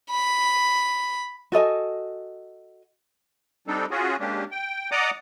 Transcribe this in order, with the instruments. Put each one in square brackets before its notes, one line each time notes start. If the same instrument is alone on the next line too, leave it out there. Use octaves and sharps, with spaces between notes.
[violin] B5
[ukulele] F#4 A4 D#5 G#5
[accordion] G3 C4 D4 D#4 A4
C#4 F4 F#4 G#4
G#3 A#3 C#4 D4 G4
G5
D5 D#5 F#5 A#5 D6 D#6